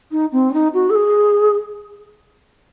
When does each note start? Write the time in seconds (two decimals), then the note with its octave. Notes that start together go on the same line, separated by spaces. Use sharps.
0.11 D#4
0.32 C4
0.50 C#4
0.53 D#4
0.73 F#4
0.89 A4
0.95 G#4